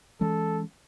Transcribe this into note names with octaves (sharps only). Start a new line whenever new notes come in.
E3 G#3 C#4 A4